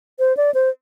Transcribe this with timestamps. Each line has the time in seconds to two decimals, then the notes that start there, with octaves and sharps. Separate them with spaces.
0.19 C5
0.37 D5
0.54 C5